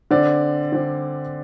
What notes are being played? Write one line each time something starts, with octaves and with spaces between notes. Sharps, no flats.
D3 C4 D5
D3 C4